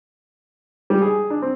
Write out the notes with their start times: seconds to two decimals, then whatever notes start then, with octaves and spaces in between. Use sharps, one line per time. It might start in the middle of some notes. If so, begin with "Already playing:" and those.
0.90 G3
1.02 G#4
1.30 D4
1.42 C4